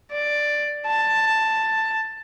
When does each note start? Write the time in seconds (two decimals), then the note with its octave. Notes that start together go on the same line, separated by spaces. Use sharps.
0.12 D5
0.87 A5